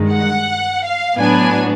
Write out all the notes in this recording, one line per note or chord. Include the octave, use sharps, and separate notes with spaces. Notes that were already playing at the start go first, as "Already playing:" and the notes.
Already playing: G2 D#3 G#3
F#5
F5
A2 F#3 B3 D4 G#5